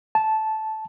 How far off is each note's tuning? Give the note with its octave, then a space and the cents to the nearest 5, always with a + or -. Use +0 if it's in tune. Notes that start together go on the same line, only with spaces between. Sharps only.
A5 -10